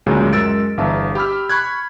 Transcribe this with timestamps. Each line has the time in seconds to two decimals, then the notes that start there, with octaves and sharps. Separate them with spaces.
0.06 D2 A#2 C#3 F#3 G#3
0.33 F#2 G#3 A#4 E6 A6 D7
0.77 G1 E2 D4 E5 F5 A5
1.15 G4 B5 E6 F6
1.49 B5 C#6 F#6 G#6